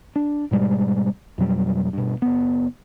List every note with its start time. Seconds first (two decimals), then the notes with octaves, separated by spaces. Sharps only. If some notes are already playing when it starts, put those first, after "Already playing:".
0.16 D4
0.51 G#2 B2 G3 G#3
1.38 F2 B2 F#3 G3
1.93 G2 B2
2.22 F#1 B3